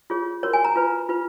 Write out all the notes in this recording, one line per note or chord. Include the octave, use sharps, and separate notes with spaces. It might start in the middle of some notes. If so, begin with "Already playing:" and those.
F4 G#4 C#5
F#4 A#4 C#5
G#5
A#5
F4 B4
F4 B4